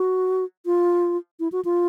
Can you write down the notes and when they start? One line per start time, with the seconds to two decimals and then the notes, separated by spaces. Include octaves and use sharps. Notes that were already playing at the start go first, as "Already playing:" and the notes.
Already playing: F#4
0.66 F4
1.40 E4
1.52 F#4
1.65 F4